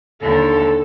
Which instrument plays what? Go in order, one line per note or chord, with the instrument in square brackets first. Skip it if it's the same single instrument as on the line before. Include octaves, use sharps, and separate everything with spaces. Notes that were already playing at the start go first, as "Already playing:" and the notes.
[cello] D#2 D3 [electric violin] A4